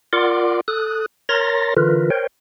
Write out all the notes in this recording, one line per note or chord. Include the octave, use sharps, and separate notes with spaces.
F4 A#4 D5 F#5 C6 D6
A4 D#6 F#6
A#4 C#5 A#5 C6 A6 A#6
D3 E3 F4 A#4 B4
A#4 C5 C#5 G5